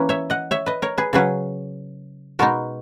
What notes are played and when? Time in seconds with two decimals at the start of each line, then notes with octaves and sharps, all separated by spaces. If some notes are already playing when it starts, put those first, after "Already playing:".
Already playing: E3 A#3 C#4 B4
0.09 C#5 E5
0.30 D#5 F#5
0.51 C#5 E5
0.66 B4 D#5
0.82 A#4 C#5
0.98 G#4 B4
1.13 C#3 F#3 C#4 G#4 B4
2.39 B2 G#3 B3 D#4 F#4 A#4